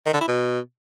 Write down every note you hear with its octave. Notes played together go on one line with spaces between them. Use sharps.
D#3
D3
E4
B2